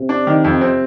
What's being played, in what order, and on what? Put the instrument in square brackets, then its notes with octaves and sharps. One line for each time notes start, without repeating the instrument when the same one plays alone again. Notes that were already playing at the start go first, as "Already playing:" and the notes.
Already playing: [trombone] C3
[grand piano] D4
D#3
F2
C4